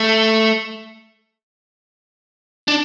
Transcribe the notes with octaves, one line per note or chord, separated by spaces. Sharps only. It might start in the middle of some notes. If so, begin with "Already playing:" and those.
Already playing: A3
D4